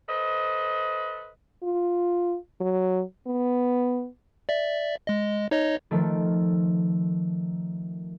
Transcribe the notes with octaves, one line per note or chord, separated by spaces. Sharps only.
A4 B4 C5 D#5
F4
F#3
B3
D5 E5
G#3 D#5
D#4 C#5 D#5
D#3 F3 A3